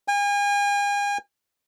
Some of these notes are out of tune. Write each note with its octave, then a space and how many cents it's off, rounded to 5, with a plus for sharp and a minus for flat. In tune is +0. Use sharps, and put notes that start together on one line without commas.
G#5 -40